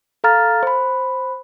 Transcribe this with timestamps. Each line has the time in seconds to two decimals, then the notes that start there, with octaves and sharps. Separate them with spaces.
0.24 A4 F5 A#5 F6 A6
0.63 C5 B5